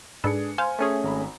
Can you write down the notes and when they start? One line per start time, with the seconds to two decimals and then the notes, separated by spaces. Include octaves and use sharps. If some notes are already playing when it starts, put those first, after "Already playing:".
0.24 G#2 D4 G#4 A4 B4 C#7
0.58 C5 F5 G#5 C6
0.79 A3 C#4 G#4
1.04 G#1 A#5 B5